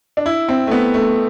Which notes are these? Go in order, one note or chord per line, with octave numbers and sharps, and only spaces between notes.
D4
E4
C4
A3
B3
A3